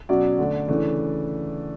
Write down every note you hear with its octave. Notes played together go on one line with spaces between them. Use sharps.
B2 F#3 C#4 D5
D3 A3 D4
C#3 E3 A3 D4